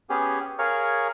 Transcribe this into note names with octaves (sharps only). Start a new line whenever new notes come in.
B3 C#4 G4 G#4
G#4 A#4 C#5 F5